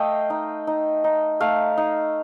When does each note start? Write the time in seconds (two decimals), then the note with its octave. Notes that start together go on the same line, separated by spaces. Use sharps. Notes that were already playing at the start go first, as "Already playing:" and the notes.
Already playing: A3 D#5 F5 G5
0.30 D#4
0.67 D#4
1.04 D#4
1.40 A3 F5
1.78 D#4